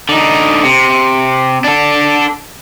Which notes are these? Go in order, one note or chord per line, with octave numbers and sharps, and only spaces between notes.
D3 D#4
C3
D4 A4